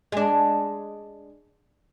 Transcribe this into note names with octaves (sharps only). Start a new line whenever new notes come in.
G#3 D4